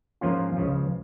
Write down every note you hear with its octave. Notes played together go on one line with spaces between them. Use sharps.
G#2 F3 A#3 C#4 F4
C#2 C#3 F3